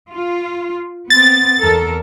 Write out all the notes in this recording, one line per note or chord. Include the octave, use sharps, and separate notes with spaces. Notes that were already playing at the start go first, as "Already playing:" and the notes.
F4
B3 C4 A6
E2 A4 A#4